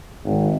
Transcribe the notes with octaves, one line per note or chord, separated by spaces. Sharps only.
G#1